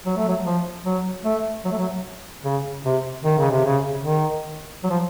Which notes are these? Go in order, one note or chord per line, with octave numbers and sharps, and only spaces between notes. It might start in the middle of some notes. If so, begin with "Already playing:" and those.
F#3
A3
F#3
F3
F#3
A3
F#3
A3
F#3
C#3
C3
D#3
C#3
C3
C#3
D#3
F#3
F3